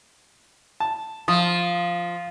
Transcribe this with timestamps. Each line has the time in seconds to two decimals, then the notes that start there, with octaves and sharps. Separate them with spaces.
0.80 A5
1.28 F3 D#6